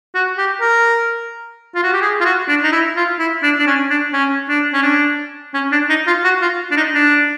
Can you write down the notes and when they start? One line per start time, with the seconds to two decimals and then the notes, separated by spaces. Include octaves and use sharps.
0.15 F#4
0.38 G4
0.61 A#4
1.74 F4
1.83 F#4
1.93 G4
2.02 G#4
2.20 F4
2.25 F#4
2.48 D4
2.63 D#4
2.72 E4
2.96 F4
3.19 E4
3.43 D4
3.58 D4
3.66 C#4
3.90 D4
4.13 C#4
4.49 D4
4.73 C#4
4.83 D4
5.54 C#4
5.72 D4
5.89 D#4
6.07 F4
6.24 F#4
6.42 F4
6.71 D4
6.77 D#4
6.94 D4